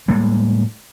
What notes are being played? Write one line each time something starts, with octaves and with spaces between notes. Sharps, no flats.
A2 G3 G#3 A#3